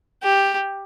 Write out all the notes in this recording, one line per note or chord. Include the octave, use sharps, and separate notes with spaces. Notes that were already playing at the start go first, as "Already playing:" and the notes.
G4